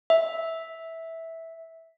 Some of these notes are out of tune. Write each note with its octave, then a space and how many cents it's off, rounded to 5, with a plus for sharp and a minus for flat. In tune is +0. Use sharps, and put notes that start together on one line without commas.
E5 -10